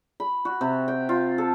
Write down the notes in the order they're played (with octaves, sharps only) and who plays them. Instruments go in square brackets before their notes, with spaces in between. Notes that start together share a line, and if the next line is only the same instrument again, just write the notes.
[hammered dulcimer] B5
F#4
C3
G5
F4
A4